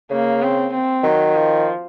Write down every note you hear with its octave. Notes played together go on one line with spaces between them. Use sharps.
C#3 A#3
C4
C4
D#3 F#3
F3